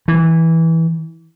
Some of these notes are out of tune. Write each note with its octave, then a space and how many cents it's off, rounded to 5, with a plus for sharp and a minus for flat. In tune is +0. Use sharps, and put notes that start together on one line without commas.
E3 -15